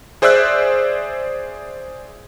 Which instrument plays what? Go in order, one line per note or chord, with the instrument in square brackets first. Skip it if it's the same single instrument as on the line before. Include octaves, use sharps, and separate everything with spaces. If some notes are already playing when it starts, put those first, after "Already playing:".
[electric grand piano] G#4 C5 D5 E5 E6 F#6